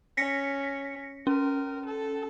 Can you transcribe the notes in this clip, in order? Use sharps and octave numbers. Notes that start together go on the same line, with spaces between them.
C#4 A#6 B6 C#7
C#4 A#4
A4